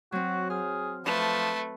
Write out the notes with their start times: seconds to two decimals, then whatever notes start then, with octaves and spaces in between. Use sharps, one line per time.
0.12 F#3 C4 F#4
0.50 G#4 F6
1.05 F3 A3 B4